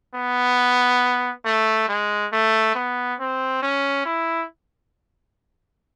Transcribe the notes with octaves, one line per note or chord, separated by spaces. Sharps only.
B3
A3
G#3
A3
B3
C4
C#4
E4